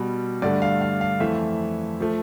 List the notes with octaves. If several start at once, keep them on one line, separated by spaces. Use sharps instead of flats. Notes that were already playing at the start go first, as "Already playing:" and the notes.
Already playing: B2 G3
G2 D3 A3 D5
F5
F5
F5
F2 E3 A3 E5
F3 A3